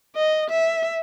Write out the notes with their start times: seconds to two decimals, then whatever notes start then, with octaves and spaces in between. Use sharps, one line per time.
0.16 D#5
0.50 E5